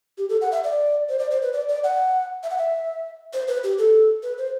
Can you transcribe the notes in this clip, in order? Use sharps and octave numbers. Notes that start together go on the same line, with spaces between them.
G4
A4
F#5
E5
D5
C5
D5
C5
B4
D5
D5
F#5
E5
F#5
E5
C5
B4
G4
A4
B4
C5